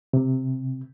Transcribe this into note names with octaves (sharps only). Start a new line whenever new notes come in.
C3